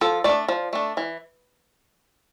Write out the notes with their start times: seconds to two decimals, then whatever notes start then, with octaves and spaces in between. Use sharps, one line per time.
0.01 F3 A4
0.24 A3 D4 D5
0.48 F3
0.73 A3 D4
0.97 E3